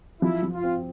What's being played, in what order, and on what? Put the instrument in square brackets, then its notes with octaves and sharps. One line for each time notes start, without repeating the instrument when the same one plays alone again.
[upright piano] F3 [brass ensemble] E4
[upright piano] F3
[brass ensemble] F4
[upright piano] C4